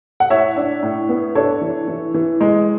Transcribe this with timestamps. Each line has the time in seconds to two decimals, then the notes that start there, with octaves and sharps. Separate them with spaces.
0.20 F#5
0.30 A2 C#5 E5
0.57 D4
0.83 A2
1.09 B3
1.35 D4 A4 C#5
1.61 E3
1.88 E3
2.14 E3
2.41 G#3